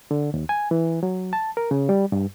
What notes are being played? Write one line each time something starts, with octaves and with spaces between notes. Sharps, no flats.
D3
D#2
G#5
E3
F#3
A5
A#4
C#3
G3
G2